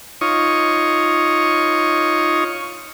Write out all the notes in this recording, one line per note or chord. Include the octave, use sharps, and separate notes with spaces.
D#4 F4 C#5 C#6 D#6